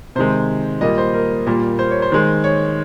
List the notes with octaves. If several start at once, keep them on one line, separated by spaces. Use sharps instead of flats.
C3 D#3 G#3 C5
A#2 G3 A#3 D#5
C5
A#4
A#2 G3 A#3
C5
C#5
C5
D#3 G#3
C#5